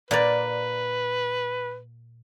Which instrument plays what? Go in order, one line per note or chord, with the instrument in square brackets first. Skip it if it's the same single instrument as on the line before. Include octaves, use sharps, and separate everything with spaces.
[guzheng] A#2 A#4 D5 [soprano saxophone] B4